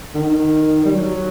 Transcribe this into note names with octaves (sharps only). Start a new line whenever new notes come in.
D#3
G3
F#3